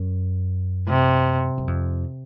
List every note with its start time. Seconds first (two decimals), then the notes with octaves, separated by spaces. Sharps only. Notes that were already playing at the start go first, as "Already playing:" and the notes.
Already playing: F#2
0.88 C3
1.58 F#2
1.67 F2